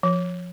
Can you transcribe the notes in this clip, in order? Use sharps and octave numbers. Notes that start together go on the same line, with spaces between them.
F3